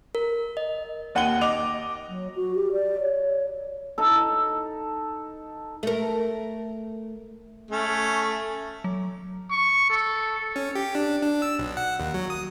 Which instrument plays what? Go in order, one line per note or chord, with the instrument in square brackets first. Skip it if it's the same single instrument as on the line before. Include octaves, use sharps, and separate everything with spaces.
[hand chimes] A#4
D#5
[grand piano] D#2 F#5 D#7 F#7 G7
D#5 D6 F7
[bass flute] F#3
F#4
G4
D5
C#5
[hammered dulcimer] D#4 A4
[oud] A3 A#4
[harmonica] A3 C#4
[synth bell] F#3
[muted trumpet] C#6
A4
[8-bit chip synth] C#4
G4
D4
D4
E6
B1
F#5
D#2
F#3
D#6